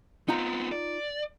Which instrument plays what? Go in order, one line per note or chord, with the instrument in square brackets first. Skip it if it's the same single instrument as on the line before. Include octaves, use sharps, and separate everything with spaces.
[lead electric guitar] B3 C4 [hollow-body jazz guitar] D#4 F4 A#5
[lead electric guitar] D5